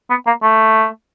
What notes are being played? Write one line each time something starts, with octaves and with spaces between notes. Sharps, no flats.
B3
A#3
A3